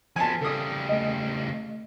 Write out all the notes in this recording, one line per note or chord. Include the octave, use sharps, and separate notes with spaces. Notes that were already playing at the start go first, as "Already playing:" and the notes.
F3 B3 G#5 A5
C#3 G3 A4 D#6
A3 D#5